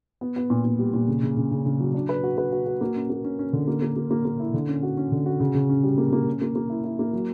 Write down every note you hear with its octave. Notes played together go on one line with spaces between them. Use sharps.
B3
B3
A#2
A#2
G3
A#2
C#3
C#3
C#3
C#3
C#3
F#3
D4
B4
F#4
B4
F#4
F#4
A#3
C#4
A#3
C#4
C#4
D3
A#3
A#3
A#3
A#3
A#3
E4
D3
C#4
F#4
C#4
D3
F#4
C#3
C#3
C#4
G3
A#3
A#3
C#4
A#3
A#3
E4
E4
A#3
F#3